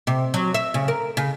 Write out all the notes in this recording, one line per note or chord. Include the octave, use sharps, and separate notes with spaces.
C3
F#3
E5
C#3
A#4
C#3